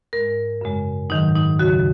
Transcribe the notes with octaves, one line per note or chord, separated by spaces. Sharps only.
G#2 G#3 A#4
F#2 C#3 G#3
G#2 D#3 F#3 D#4
D#4
D#2 C#3 F#3 F#4